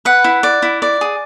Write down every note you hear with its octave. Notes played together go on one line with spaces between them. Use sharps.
B4 F#5
E4
D5
E4
D5
G#4